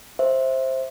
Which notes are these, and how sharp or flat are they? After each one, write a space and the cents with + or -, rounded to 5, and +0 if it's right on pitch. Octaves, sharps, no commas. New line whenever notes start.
C5 +10 E5 -5